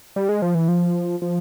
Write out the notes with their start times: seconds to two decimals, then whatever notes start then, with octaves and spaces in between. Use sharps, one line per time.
0.16 G3
0.29 G#3
0.42 F3
0.55 E3
0.68 F3
1.22 F3